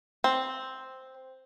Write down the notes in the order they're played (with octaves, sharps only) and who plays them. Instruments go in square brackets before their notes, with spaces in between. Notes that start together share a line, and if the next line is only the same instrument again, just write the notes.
[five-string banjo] C4